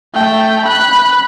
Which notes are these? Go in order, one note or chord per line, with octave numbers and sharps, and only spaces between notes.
A3 G5
B5 F#6